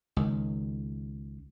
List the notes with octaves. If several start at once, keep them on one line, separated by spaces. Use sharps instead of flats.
C#2 D#3